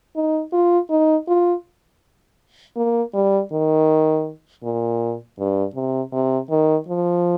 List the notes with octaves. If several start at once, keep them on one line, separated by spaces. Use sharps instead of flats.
D#4
F4
D#4
F4
A#3
G3
D#3
A#2
G2
C3
C3
D#3
F3